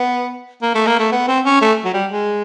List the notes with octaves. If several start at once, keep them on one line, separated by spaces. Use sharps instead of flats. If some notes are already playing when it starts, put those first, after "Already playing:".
Already playing: B3
A#3
A3
A#3
A3
B3
C4
C#4
A3
F#3
G3
G#3